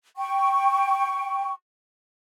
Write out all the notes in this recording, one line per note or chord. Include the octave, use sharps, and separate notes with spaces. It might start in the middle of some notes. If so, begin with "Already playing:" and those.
G5 C#6